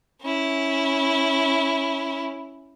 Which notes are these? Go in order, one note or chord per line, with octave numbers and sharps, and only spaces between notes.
C#4 E4